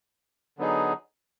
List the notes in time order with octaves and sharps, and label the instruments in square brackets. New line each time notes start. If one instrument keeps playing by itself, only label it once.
[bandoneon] D3 F#3 B3 D#4 G#4